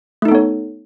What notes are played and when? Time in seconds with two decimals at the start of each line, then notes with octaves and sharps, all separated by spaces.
0.22 A3
0.25 D#4
0.28 A4
0.32 B3
0.35 C#5